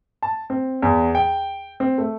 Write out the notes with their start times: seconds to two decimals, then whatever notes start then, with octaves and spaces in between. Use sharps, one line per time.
0.23 A5
0.50 C4
0.82 E2
1.15 G5
1.80 C4
1.98 A3